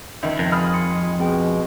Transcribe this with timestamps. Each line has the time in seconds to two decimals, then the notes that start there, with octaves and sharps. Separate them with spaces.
0.23 C#2 D#3 D#4 E5
0.39 F2 A#4 F#6
0.52 D#3 G#3 G#4 B5 D#6 F6
0.74 C6 C#7
1.20 B2 G#3 C4 G#4 G5